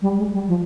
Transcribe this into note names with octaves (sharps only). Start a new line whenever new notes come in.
G3
G#3
G3
F3